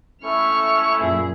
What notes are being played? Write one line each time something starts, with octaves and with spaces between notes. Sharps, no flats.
A3 C#4 E4 C#6 F6
F#2 A#2 G#4